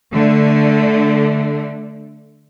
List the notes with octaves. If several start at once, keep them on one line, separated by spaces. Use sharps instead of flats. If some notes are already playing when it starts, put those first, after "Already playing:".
D3 A3